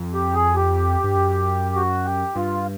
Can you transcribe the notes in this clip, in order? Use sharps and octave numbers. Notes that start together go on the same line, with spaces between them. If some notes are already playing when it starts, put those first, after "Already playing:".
Already playing: F2
G4
G#4
G4
G2
F#2
F#4
G4
G2 F4